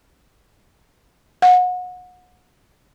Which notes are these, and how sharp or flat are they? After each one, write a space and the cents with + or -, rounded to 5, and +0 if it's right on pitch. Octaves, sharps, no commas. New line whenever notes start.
F#5 -30